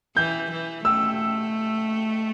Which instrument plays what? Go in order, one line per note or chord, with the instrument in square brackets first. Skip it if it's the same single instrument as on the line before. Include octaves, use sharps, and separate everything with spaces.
[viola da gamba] E3 [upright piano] G6
[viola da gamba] E3
[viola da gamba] A3 [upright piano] E6